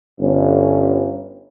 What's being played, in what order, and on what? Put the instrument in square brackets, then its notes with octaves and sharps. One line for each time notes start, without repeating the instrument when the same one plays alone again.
[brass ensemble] G1 [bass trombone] C#4